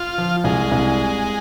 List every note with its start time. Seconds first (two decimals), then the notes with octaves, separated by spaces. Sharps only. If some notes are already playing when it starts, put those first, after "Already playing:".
Already playing: F4
0.18 F3
0.44 C2 G#3
0.71 C2